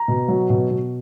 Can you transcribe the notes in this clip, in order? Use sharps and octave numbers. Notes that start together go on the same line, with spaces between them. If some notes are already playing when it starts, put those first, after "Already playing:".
Already playing: A#5
B2
F#3
B2
B2